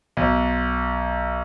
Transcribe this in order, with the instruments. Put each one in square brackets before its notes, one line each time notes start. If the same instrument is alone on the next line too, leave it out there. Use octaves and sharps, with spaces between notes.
[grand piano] B1